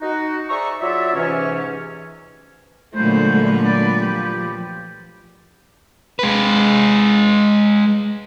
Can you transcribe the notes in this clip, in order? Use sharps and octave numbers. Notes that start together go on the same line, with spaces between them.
D#4 F#4
G#4 C5 D5 E5 A#5 C#6
F#3 F4 D5 E5
G#2 C3 E3 C#4
A#2 D3 F#3 G#3 A3 B4 C5
D5
F3 G4
G#3 B4